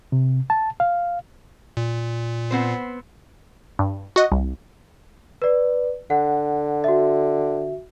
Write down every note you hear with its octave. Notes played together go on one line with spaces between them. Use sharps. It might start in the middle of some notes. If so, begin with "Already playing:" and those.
C3
A5
F5
A#2
B3 C4 C5
G2
F#4 D#5
C2
B4 D5
D3 F#5
F#4 E5